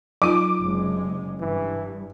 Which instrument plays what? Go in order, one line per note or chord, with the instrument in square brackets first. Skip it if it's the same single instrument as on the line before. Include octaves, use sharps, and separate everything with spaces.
[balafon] F#3 D#4 F4 [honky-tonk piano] D6
[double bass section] F#1 C3 G#3
[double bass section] G2 [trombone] E3